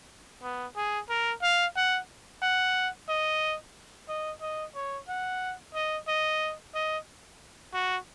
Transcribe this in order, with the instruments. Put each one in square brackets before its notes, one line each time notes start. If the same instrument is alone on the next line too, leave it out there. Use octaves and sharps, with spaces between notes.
[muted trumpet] B3
G#4
A#4
F5
F#5
F#5
D#5
D#5
D#5
C#5
F#5
D#5
D#5
D#5
F#4